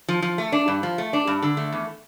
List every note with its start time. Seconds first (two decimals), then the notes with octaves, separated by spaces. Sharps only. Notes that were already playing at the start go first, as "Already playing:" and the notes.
0.08 F3
0.22 F3
0.38 A3
0.52 D4
0.68 G2
0.83 F3
0.98 A3
1.13 D4
1.27 G2
1.42 D3
1.57 A3
1.72 E2